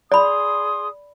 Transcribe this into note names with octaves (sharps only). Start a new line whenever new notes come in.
G#4 D5 B5 C6 D#6